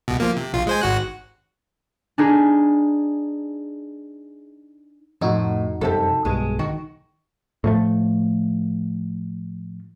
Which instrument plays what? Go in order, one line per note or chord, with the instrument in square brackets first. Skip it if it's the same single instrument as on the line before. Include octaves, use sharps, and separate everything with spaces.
[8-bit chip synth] C2 B2
F3 A#3
C3
A#1 F4
G#3 C5 G#5
G#1 F#4 F#6
[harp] D4 D#4 G#4
[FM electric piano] F2 D#4 F#4 [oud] A2 C3
[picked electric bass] F#2 C3 G3 [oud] G4 A4
[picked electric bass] B1 G2 [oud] G#3
[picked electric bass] D#3 [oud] F#4
[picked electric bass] A2 F3 A3